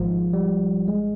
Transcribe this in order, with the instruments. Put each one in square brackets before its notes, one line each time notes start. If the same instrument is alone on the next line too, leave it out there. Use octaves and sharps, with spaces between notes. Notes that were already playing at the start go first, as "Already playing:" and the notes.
Already playing: [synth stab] G#1 G#2 [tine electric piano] F3
[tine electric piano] G3
G#3